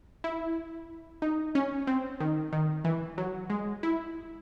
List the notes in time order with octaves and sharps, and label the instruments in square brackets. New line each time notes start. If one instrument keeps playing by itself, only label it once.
[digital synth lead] E4
D#4
C#4
C4
D#3
D#3
E3
F#3
G#3
E4